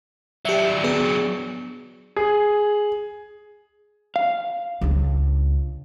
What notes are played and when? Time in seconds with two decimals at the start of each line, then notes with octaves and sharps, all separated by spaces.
0.45 F#3 D4 G4 E5
0.84 B3 G#4
2.17 G#4
4.16 F5
4.81 C#2 D4